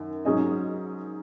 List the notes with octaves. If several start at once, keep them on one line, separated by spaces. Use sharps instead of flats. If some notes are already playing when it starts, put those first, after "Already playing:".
Already playing: F#2 D#3
G#2 F#3 C#4 G#4 D#5